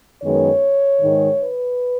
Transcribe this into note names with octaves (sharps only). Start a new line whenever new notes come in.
F#2 D#3 G#3 B3 C#5
G#2 D#3 G#3
B4